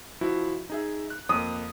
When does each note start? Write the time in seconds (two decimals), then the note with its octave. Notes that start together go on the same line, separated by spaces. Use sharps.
0.21 F3 E4 F#4
0.70 D#4 G#4 E5
1.10 F#6
1.29 F2 A#3 D#6